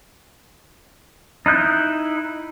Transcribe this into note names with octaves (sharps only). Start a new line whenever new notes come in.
D#4 E4 F#6 G6